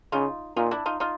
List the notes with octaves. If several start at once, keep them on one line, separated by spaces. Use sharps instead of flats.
C#3 D#4 F4
A#2 D#4 F4
D4 E4
D#4 F4
D#4 F4